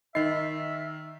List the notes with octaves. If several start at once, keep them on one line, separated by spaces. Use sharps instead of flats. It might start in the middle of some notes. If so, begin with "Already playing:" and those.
D#3 D#4 D#5 E5 C7